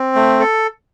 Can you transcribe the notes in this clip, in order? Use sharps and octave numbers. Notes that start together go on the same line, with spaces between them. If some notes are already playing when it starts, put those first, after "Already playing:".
Already playing: C4
A3
A4